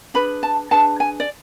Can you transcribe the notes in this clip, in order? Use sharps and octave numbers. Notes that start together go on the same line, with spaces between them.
D4 G#4 B4 B5
A5
D4 G#4 B4 A5
G#5
D5